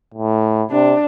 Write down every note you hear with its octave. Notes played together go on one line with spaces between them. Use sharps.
A2
C3 D4